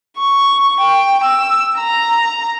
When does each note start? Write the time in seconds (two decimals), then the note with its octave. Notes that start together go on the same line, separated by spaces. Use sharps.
0.18 C#6
0.80 G5
1.24 E6
1.78 A#5